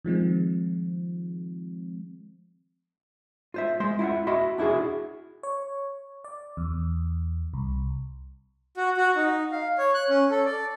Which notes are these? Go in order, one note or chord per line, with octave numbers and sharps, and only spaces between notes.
D#3 F3 G#3 C4
F4 C5 E5
G#3 C5 C6
E4 F4 E5 F#5
F#4 D#5 E5 B5 C6
D4 E4 F#4 G#4
C#5
D5
E2
C2
F#4
F#4
D#4
F5
C#5
F#6
C#4
A4
D5